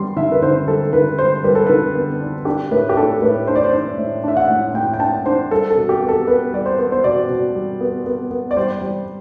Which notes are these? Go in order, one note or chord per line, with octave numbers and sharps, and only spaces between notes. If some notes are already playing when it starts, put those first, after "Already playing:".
Already playing: D3 G3 B3 C6
D3 E5
B4
D3 C5
G3 A4
D3 B4
G3 C5
G3 B4
A4
D3 B4
B3
D4
D4 G4
A2 B4
G4
D4 A4
A2 B4
D4 C5
D5
C5
D4
A2
D4 E5
F#5
A2
A2 G5
G5
D4 A5
D4 C5
G3 A4
A4
B2
G4
B3
A4
B3 B4
G3 D5
C5
B3
C5
B2 D5
B2
G3
B3
B3
B3
D5
G3 C5
G3